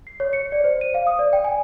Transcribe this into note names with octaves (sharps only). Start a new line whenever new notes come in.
C7
C#5
C#7
D5
C5
D#7
F5
D#6
D5
G5
G#5